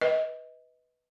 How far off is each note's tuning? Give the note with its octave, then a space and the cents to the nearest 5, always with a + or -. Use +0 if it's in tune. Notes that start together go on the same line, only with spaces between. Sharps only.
B4 +0 D#5 +25